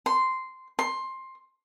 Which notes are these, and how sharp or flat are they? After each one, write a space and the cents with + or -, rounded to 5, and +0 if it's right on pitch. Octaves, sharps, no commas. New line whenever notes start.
C6 -10
C6 +15